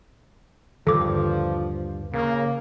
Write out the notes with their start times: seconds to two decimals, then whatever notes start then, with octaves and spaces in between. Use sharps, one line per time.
0.87 D#1 G2 D3 D#3 F3 A4 D6
2.13 C#3 A#3